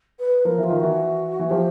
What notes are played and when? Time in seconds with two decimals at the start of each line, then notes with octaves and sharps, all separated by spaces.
0.19 B4
0.45 F3 A#4
0.58 E3
0.64 F4
0.70 D#3
0.80 E3 F#4
1.39 E3
1.50 F3 G4